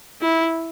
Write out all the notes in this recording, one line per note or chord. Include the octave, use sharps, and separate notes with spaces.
E4